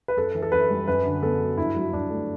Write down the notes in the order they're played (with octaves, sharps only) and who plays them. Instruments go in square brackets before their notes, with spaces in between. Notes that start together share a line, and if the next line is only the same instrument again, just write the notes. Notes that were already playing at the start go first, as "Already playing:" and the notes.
[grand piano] B4
F#2 A4
E3
A4
F#2 B4
G3
F#2 B4
D3
B3 A4
F#3
G2 E4
F#3
G2 D4
A3